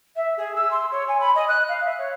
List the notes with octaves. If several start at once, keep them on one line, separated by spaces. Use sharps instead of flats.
E5
G#4
E6
C6
C#5
G#5
B5
D#5
F#6
F5
E5
C#5